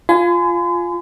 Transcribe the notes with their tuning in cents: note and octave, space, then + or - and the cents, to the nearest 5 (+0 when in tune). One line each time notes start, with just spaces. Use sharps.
F4 +0 G#5 +15 C6 -45